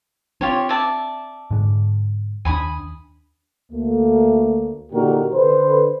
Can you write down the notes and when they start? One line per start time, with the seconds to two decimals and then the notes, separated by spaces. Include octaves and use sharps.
0.41 C4 D4 F4 G4 C#5
0.69 D5 E5 A5
1.51 G#2 D3 G#3
2.45 D#2 D4 G#5 B5 D#6
3.72 D2 A3 A#3
4.93 A#2 D3 D#4 F#4 G4 A#4
5.34 D3 B4 C5